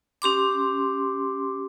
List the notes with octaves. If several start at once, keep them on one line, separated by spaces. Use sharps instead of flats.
C#4 G4 C6 D6